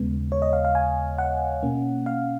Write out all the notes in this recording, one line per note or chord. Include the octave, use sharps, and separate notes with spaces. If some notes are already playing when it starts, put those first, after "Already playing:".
Already playing: D#2 C#3 G#3 B3
C#5
D#5
F5
F5
G#5
F#5
B2 A#3 C#4
F5